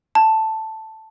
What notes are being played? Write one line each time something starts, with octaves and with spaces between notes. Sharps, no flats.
A5